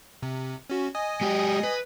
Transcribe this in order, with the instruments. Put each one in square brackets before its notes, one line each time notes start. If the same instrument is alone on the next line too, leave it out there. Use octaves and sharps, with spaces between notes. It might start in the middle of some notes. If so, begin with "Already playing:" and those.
[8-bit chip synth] C3
C#4 F#4
D#5 G#5 D#6
[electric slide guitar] G#3 G4
B4